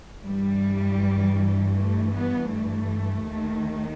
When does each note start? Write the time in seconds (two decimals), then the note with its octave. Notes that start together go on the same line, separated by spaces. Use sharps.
0.23 G2 E3 G3
1.76 A3
2.14 B3
2.53 A3
3.29 D#2 D#3